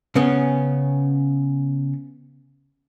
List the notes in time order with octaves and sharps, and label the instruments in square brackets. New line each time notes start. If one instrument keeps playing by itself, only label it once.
[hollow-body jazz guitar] C#3 B3 C#4